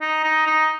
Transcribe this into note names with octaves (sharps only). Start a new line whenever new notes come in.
D#4
D#4
D#4